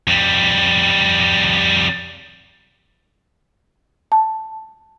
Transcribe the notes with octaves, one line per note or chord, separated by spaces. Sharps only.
F2 G3
A5